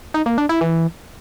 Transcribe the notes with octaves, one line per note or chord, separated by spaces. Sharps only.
D#4
A#3
D4
E4
E3